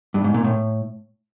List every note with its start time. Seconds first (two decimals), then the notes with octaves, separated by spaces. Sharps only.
0.14 G2
0.24 G#2
0.34 A#2
0.44 A2